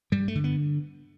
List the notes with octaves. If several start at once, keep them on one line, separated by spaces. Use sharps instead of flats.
G2 G3
A3
D3
B3